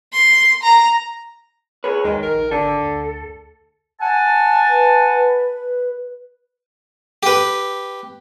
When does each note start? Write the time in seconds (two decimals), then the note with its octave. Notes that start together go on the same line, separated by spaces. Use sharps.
0.13 C6
0.63 A#5
1.84 G#4 B4 C#5
2.04 D#2 D#3 G#3
2.23 A#1 A#4
2.51 G#1 D3 A4
2.82 D2
4.01 F#5 G#5 A5
4.67 B4
7.23 G4 B4